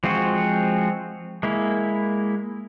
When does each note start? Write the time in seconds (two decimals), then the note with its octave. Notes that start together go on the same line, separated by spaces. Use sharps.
0.04 F3 G#3 C4 F4 F#4
1.43 G#3 A#3 E4